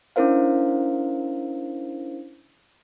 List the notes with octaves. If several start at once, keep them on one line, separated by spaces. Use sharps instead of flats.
C#4 D4 E4 A#4 C5 F5